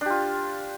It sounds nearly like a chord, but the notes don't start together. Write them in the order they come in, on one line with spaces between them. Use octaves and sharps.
D4 G4 F4